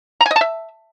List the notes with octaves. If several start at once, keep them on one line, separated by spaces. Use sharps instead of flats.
A#5
G#5
D#5
A5
E5